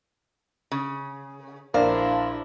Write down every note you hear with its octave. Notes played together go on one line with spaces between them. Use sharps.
C#3
A#1 D4 E4 A#4 C5 D5 F5